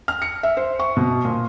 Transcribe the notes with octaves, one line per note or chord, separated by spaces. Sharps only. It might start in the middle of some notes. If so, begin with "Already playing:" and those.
F6
C#7
E5
C5
C#6
B2
A#2